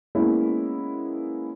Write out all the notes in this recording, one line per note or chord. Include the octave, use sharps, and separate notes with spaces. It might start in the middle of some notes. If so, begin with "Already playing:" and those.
G#3 A#3 B3 C#4 E4